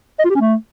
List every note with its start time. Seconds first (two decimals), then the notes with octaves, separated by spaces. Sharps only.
0.19 D#5
0.25 F4
0.30 G4
0.35 C#4
0.41 A3